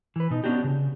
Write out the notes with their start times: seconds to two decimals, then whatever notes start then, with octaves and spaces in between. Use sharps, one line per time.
0.16 E3 B4
0.30 B2 D#4
0.44 B3 C#4 D4 F#4 G4
0.64 C#3